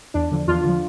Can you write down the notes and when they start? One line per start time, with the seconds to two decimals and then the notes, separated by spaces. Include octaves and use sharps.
0.14 E2 D4
0.31 D3 F3
0.48 E2 D4 F4
0.65 D3 F3